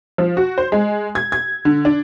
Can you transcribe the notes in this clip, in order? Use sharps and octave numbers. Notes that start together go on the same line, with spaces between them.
F3
F#4
C5
G#3
G#6
G#6
D3
D4